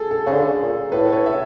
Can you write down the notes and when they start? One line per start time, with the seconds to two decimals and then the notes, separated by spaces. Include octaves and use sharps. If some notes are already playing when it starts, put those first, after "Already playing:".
Already playing: G#4 A4
0.11 A4
0.26 C#3 G#4
0.32 D3 A4
0.62 A#2
0.92 A2 A4 B4
1.12 B4 C#5
1.26 E5